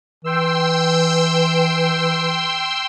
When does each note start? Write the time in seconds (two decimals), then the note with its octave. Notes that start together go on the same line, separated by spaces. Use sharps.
0.24 E3 G5 C6 E6